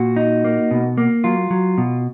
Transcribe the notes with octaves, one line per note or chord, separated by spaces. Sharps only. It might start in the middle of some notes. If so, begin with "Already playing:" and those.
Already playing: A#2 F#4
D#4
A#3
B2
A#3
F#3 F4
F#3
B2